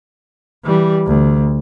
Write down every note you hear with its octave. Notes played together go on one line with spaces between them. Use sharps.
E3 G3
D2